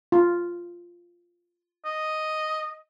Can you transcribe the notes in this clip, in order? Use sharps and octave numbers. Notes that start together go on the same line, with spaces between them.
F4
D#5